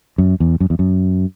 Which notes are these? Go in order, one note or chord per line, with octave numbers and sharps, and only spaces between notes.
F#2
E2
F#2
E2
F#2